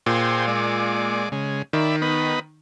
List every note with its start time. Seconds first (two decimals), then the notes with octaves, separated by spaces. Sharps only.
0.06 A#2 G#4 C5 G5
0.47 G#3 D5
1.32 C#3 G#3
1.73 D#3 D5 E5 B5
2.02 B3 D#4 B4